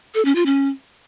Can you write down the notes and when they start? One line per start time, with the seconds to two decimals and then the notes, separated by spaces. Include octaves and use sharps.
0.15 A4
0.25 C#4
0.35 F4
0.46 C#4